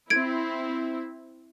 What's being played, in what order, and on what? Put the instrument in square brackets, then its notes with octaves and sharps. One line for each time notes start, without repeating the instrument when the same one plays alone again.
[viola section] C4 E4 [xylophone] G#6 D7